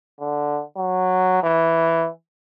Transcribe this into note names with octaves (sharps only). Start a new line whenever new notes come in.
D3
F#3
E3